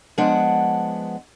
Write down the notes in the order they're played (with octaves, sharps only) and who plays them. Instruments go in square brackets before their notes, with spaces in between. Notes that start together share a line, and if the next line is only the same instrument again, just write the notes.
[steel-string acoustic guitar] F3 G#3 B3 D4 F#5